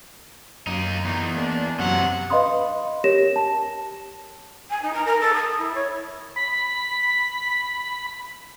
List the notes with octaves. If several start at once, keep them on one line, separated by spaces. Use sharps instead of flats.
F#2 A#3 D#4
E2 D#4
A#3 D4
F#2 C3 F#3 F#5
B4 D#5 F5 B5 C6 D#6
G4 A#4 C#5 A#6 E7
A5
G#5
D#4
A#5
A#4
A4
D#6
E4
C#5
B5 B6